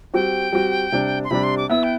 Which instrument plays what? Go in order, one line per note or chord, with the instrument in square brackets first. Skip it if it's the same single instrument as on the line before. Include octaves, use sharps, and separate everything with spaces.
[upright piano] G3 C4 F#4 [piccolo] G5
[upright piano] G3 C4 F#4
C3 G3 D4
[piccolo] C6
[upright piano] C3 G3 D4 [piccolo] B5
[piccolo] C6
D6
[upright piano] B3 E4 B4 E5 [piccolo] E6
[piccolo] G5